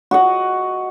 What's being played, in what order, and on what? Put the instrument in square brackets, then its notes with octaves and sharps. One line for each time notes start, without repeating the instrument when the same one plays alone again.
[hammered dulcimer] F#4 D#5 F#5